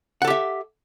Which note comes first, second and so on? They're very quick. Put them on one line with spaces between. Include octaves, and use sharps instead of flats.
F#5 A4 G4 E5